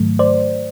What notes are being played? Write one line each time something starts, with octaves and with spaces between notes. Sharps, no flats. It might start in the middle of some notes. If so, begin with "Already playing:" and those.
Already playing: G#2 D#3 F#3 A3
C5 D5